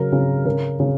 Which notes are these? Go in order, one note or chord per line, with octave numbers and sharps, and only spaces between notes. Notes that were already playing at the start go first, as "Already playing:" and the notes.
Already playing: C#3 F#3 A#4
C#3
C#3 A#4
C#3